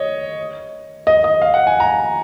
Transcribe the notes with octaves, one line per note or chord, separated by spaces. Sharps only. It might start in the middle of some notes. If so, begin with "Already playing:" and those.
Already playing: C#5 D#5
D#5
D#5
F5
F#5
G#5
A#5